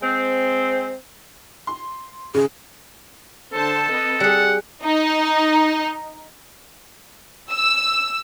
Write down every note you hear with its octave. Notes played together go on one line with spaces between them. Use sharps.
G#3 C4
C6
C#3 G#4
D3 A4 C5 A5
C4 B4 D#5
G3 G4 G#4 F#5
D#4
E6